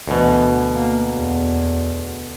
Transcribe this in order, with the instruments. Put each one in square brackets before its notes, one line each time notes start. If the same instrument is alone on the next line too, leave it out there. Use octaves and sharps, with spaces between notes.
[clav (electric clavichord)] D2 B2 [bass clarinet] E3
[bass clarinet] A#3
E2